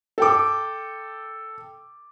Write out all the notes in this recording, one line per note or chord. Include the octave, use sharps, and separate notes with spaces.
A4 G5 D6